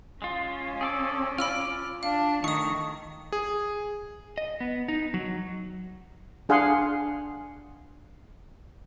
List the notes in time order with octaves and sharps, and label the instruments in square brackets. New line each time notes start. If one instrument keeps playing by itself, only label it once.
[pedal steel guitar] G#3 F4 [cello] C#4
[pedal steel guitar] G#4 A4 D6
[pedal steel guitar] F4 D5 [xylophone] B5 E6 F6
[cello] D4 [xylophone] F5
[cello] D#3 [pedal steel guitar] A3 D#4 [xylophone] C#6 D#6
[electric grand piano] G#4
[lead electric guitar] D#5
B3
D#4
F#3
[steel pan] D4 G#4 F5 F#5 C6